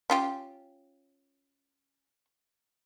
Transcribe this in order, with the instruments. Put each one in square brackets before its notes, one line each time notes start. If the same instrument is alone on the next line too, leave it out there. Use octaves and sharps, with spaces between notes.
[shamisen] C#4 F4 G4